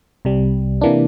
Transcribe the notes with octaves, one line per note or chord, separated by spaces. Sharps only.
C2 C3 G3
C3 E3 A#3 D4